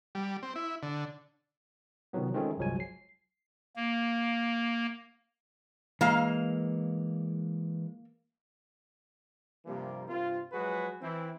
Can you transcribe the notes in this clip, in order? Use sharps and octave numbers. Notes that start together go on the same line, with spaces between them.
G3
C4
E4
D3
C3 D#3 F3 F#3 B3
D#3 F3 G#3 A3 C4 C#4
G1 C2 F3 F#3 G#3 G#5
C7
A#3
E3 G#3 A#3 F5
G2 C3 F3 G3 A#3
G2 C3 C4 F4
F3 F#3 G#3 F#4 G#4 B4
E3 C4 E4